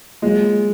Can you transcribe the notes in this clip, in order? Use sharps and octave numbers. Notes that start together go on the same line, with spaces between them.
F#3 G#3 A#3 F4